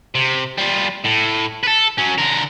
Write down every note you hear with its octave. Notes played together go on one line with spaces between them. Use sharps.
C3
G3 F4
A2
A4 B4
F#3 C#4
D3 A#4